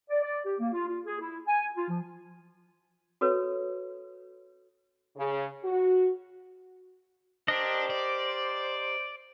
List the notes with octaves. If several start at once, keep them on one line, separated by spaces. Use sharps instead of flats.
D5
D5
G4
A#3
F4
F4
G#4
E4
G#5
F4
F3
F#4 A4 B4 C#5
C#3
F#4
D4 G4 A#4 C5 D#5
D5